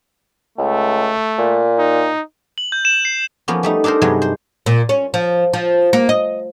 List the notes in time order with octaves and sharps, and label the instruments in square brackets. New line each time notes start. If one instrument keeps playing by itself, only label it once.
[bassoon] C#2 [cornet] A3
[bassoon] A#2
[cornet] D#4
[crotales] F#7
G6
E7
C7
[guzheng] F3 A#3 B3 C#4
G3 A3 D#4
D4 D#4 A4 A#4 C5
G2 C3 F#3 G#3 B3
C5
[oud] A#2
C#4
F3
F3
A#3
D#5